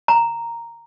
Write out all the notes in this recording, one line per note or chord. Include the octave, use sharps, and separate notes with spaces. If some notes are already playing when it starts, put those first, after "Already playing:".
A#5